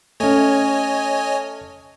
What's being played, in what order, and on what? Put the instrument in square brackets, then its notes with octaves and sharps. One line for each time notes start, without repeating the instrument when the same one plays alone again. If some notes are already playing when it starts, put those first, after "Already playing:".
[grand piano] A3 C#4 [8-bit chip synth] C#5 D#5 G#5